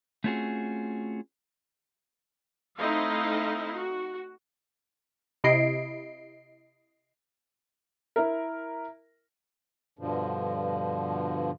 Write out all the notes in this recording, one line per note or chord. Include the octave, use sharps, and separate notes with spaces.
A3 C4 C#4 F4 F#4 G#4
A3 C4 D#4 E4 D#5 F5
F#4
C3 E4 D#5 C7 D7
E4 A#4
G2 B2 D3 F3